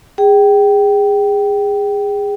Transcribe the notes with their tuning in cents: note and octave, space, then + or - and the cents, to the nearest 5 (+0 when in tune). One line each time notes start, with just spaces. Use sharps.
G#4 -20 G5 -15